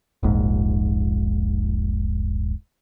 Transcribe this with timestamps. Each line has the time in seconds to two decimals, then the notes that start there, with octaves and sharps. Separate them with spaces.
0.23 D#1 A#1 G#2